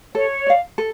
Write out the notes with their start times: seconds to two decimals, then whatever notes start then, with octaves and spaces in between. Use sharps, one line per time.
0.14 A4 C#5
0.47 D5 F5
0.78 A4